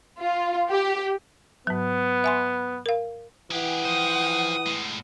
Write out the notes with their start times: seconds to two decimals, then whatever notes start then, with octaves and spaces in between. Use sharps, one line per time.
0.20 F4
0.69 G4
1.67 G#2 F#3 B3
2.24 E5 G#5 C6
2.86 A#4 F5
3.51 E3 G4 G#4 F#5 G5
3.85 F3 C5 D#6
4.66 A2 G#3